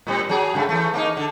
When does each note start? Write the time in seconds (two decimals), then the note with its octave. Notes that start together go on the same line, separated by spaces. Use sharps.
0.07 A2 G3 C4
0.29 F#3 G#4
0.54 G2 C#3 A3
0.69 E3 A3
0.94 A#3 C4 D#4
1.17 D3